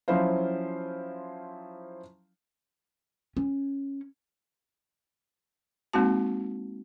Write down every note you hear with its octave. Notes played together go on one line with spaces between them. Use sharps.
F3 F#3 C#4 E4 C5 F5
C#4
G#3 A#3 C4 D#4 F#4 A5